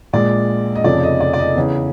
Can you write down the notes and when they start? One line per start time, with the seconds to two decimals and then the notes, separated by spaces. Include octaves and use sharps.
0.13 A#1 A#2 F3 G#3 D5
0.75 D#5
0.84 F1 F2 C#3 F3 D5
1.03 D#5
1.21 D5
1.34 D5
1.39 D#5
1.56 E2 C#3 E3